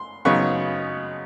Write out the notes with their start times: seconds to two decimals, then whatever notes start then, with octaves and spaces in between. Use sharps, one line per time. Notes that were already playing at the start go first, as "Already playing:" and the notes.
Already playing: C6
0.25 C#3 F#3 B3 D#4 C#6